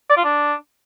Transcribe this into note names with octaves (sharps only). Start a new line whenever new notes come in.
D5
F4
D4